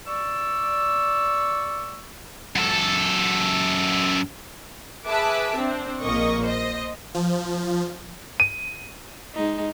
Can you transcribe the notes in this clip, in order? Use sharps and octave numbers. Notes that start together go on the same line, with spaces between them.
D5 C#6 E6
F#2 A4
G#4 B4 E5 A5 D6
C4 D4
A#1 A#2 A#3 D#5 C#6
C5 D#5
F3
D#7
G#3 D#4